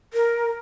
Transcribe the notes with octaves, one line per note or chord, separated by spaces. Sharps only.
A#4